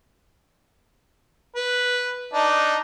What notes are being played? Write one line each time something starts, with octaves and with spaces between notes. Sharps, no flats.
B4
D4 D#4